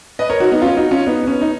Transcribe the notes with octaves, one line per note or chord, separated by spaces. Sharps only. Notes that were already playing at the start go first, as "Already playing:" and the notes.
B4 D#5
A#4 C#5
D#4 F#4
B3 D#4
C#4 F4
D#4 F#4
C#4 F4
B3 D#4
B3
C#4
D#4